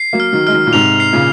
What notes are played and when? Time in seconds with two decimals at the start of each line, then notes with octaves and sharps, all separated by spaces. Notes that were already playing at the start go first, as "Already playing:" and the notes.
Already playing: C7
0.13 F#3 A#3
0.20 F6
0.33 D#3 F#3
0.47 G#3 F6
0.53 D#3 F#3
0.67 A#2
0.73 G#2 C3 F7
1.00 C7
1.13 A#2 C#3